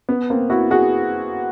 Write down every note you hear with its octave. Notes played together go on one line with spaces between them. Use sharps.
B3
A#3 C4
E4 F#4
F#4 G#4